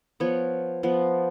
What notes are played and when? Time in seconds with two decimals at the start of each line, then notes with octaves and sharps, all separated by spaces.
0.20 F3 B3 C#5
0.83 F3 B3